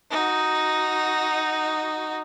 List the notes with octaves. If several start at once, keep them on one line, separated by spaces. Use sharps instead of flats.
D#4 F#4